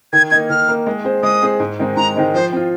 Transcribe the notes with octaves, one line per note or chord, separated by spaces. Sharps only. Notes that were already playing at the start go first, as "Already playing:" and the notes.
D#3 G#6
A#3 D#4 G#6
D#3 F6
A#3 D#4
G#3
C4 G#4 C5
G#3 D#6
C4 G#4 C5
G#2
D#3 G#3 C4 D#4
G#2 A#5
D#3 G#3 C4 D#4
F3 C5
C4 F4